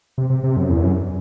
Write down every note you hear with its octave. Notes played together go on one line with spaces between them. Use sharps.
C3
C3
C3
F#2
E2
F#2